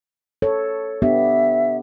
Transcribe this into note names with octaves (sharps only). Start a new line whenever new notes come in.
A4 C#5
B3 D4 G4 E5